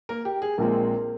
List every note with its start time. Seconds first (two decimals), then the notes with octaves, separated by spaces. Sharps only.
0.09 A#3 A#4
0.25 G4
0.42 G#4
0.58 A#1 A#2 G#3 A#3 C4 A#4